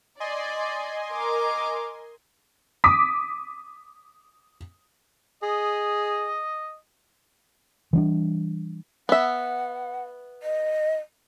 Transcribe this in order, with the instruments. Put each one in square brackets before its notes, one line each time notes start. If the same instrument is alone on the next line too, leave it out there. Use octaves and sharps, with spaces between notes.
[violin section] D5 [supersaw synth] D#5 G#5 C6
[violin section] A#4 D6
[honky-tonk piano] D6 D#6 B6
[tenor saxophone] G#4 [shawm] D#5
[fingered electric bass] E3 G3 C#4 D4
[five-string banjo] B3 E5 [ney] F#5
[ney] D#5